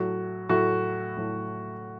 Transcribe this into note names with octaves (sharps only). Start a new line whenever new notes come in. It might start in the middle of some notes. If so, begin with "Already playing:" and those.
Already playing: A2 F#3 A3 F#4
A2 F#3 A3 F#4
A2 F#3 A3